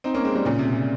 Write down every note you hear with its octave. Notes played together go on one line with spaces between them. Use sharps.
C4 D#4
A#3 C#4
G#3 C4
G3 A#3
A#2 C#3
C3
C3